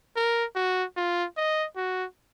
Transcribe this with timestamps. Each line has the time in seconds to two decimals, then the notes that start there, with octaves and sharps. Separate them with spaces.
0.16 A#4
0.56 F#4
0.97 F4
1.37 D#5
1.76 F#4